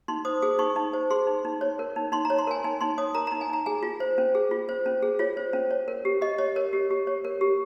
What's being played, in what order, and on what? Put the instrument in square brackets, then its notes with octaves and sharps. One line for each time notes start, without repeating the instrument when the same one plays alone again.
[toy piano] D#4 C6
C5 D#6
G#4 D#6
D#4 C#6
D#4
C5
G#4 C6
D#4
D#4
C#5
A#4
D#4
D#4 C6
A#5
C#5
C6
A#4 G#5
D#4 G#5
D#4 C6
C#5 D#6
A#4 A#5
D#4 A#5
G#5
D#4 A#5
G#4 G#5
F4
C5
C#4
G#4
F4
C5
C#4
G#4
F4 C#5
C5
C#4
C#5
A#4
G4
G4 D#5
C#5 D#5
A#4 C#5
G4
G4
C#5
A#4
G4